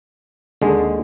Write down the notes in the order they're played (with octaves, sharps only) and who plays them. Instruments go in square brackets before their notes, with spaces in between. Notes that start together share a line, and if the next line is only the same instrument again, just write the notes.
[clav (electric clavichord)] D#2 D3 G#3